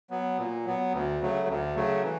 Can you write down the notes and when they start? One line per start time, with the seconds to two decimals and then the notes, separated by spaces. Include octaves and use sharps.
0.10 F#3 B3
0.38 A#2
0.65 F#3 B3
0.93 D2
1.21 C#3 F#3 A3
1.48 D2
1.75 C#3 F#3 A3
2.03 E3